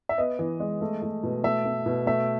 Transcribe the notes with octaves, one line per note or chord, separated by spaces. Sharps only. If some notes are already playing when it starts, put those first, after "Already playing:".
E5
B3 D#5
E3
G#3
A3
A3
B2
A3 E5
A3
B2
A3 E5